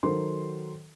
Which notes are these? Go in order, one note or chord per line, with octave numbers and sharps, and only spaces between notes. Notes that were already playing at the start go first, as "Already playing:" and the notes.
D#3 F#3 A4 A#4 C5 C6